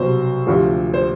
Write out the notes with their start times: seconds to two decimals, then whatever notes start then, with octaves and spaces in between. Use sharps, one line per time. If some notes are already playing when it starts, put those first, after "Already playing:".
Already playing: C2 B2 F#3 C5
0.47 D2 C3 F3
0.94 C5